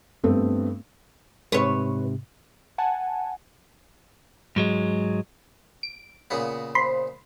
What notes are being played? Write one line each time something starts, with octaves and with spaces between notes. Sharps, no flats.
G2 A3 B3 C4
G#2 C3 B4 C#5
F#5 G#5 A5
G#2 F#3 G#3
D7
A#2 C#3 B3
C5 B5 C6